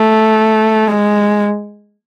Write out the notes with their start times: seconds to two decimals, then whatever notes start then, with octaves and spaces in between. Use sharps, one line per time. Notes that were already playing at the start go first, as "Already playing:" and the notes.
Already playing: A3
0.87 G#3